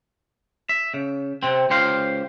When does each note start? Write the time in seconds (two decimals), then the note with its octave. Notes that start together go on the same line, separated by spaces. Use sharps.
0.69 E5
0.94 C#3
1.43 C3 C4
1.70 C#2 G4 C5 F5